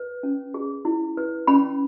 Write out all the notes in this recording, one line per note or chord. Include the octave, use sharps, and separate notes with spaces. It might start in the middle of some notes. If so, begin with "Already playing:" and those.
Already playing: B4
C#4
G#4
E4
B4
C#4 B5